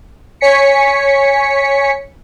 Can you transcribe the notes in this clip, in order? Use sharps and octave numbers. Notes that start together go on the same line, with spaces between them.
C#5 G#5 B6 C#7